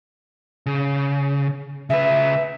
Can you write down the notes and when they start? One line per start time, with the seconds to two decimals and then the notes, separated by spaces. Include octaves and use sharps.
0.66 C#3
1.90 C#3 B4 E5